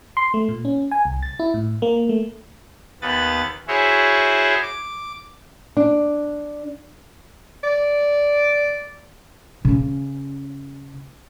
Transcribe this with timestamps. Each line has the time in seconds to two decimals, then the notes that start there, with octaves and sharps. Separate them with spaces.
0.17 C6
0.34 A3
0.49 A#2
0.65 C#4
0.91 G#5
1.05 C2
1.23 A6
1.39 E4
1.54 A2
1.82 A#3
2.09 A3
3.02 D#2 B3 B4 A6
3.68 E4 F#4 G#4 C5 C#5 E5
4.62 D6
5.77 D4
7.64 D5
9.65 C#3 C#4